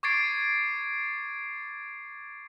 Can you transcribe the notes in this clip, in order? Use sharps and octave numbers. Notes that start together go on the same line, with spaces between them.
C#6 D6 G#6 A6 C7 D7